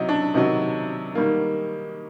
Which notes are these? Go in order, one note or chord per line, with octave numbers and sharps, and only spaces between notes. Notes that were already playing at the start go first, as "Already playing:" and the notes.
Already playing: C3 F#3 D#4 E4
D4
C3 D#3 F#3 D#4
D#3 G3 A#3